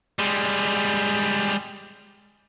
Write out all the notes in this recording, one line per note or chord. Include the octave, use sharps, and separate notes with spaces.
G3 G#3